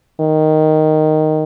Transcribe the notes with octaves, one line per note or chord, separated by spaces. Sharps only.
D#3